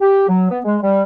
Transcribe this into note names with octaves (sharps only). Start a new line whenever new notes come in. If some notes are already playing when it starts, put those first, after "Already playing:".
G4
F#3
B3
G#3
G3